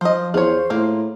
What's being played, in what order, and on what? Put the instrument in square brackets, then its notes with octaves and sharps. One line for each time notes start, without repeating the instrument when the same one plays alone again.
[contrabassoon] F3 [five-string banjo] C5 D#5
[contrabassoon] E2 [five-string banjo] F4 C#5 [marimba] G#4 [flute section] C5
[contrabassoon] A2 [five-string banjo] A#3 F4